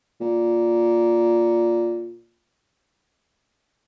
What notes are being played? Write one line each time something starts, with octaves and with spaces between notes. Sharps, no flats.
A#2